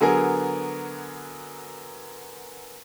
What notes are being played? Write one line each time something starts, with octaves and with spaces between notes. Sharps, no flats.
D3 F#3 B3 G#4 A#4